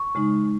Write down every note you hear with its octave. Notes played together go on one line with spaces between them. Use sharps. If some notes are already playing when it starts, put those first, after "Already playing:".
Already playing: C#6
C#3 G#3 D#4